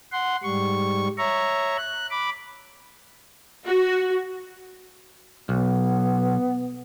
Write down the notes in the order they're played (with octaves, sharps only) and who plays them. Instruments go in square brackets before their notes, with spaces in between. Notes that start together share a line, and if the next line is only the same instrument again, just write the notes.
[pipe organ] F#5 C6
G#2 G3 C#6
C#5 E5 A#5 C#6
F#6
B5 D6
[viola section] F#4
[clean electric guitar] B1 [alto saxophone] B3